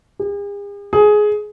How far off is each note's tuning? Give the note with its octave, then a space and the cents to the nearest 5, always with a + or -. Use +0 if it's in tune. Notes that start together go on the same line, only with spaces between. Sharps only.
G#4 -45
G#4 +15